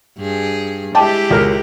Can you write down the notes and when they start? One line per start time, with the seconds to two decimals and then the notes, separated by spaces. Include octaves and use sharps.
0.18 G2 G#4
0.95 G#3 E4 G4 G5 A5 D6
1.30 C#2 A#4